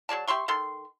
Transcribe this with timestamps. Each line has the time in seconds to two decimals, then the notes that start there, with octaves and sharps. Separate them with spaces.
0.09 F#3 G#4 D5 A5
0.27 G4 E5 C6 C#6
0.48 D#3 A4 C6